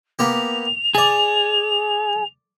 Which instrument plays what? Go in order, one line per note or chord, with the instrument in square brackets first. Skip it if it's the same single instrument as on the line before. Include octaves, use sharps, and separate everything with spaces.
[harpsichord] A#3 B3 G4 [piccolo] F7
[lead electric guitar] G#4 [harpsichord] D5 A5